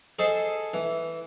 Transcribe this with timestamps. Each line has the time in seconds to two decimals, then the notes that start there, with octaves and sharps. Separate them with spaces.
0.19 G#4 A4 C5 D#5
0.74 E3